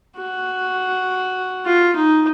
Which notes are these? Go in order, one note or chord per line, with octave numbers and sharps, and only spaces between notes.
F#4
F4
D#4